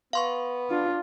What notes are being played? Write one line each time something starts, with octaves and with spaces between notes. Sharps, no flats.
B3 F5 C6 C#6
D4 F4